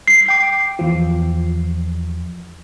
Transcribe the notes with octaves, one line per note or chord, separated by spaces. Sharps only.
C7
G5 D6
E2 F3